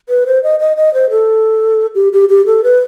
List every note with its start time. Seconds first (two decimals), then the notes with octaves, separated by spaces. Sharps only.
0.09 B4
0.27 C5
0.44 D#5
0.60 D#5
0.77 D#5
0.94 C5
1.10 A4
1.95 G4
2.13 G4
2.29 G4
2.46 A4
2.64 B4